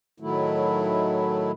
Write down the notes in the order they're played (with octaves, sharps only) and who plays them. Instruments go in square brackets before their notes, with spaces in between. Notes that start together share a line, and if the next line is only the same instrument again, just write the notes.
[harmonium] A2 D#3 F#3 A3 E4